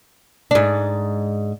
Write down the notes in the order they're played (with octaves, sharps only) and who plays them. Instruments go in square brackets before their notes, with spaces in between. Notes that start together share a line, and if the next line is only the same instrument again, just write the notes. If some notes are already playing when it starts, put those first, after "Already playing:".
[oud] G#2 D4